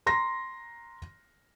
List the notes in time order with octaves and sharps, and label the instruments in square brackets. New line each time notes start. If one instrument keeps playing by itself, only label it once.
[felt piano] A#5 C6 A#6